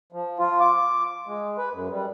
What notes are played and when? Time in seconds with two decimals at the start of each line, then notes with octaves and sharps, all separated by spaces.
0.12 F3
0.39 F4
0.60 D6
1.27 G#3
1.58 B4
1.73 F#2
1.91 G3